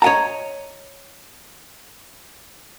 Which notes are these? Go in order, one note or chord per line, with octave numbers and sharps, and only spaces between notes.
C#5 D#5 F#5 A5 A#5